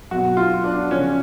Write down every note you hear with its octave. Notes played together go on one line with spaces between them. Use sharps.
B2 F#3 F#4
F4
D4
C#3 F3 C#4